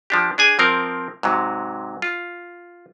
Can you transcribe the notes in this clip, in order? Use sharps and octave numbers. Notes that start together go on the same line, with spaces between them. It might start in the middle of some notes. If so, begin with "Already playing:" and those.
F3 D4 G4
D4 G#4 G#5
F3 C4 A#4
G#2 C3 F#3
F4